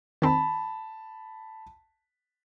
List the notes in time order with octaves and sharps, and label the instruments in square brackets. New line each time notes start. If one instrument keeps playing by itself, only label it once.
[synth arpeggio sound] D#3 C4 [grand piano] A5 B5